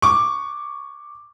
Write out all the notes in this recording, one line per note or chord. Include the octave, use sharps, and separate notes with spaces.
C#6 D6